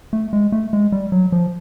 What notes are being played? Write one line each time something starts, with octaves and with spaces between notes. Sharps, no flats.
A3
G#3
A3
G#3
G3
F#3
F3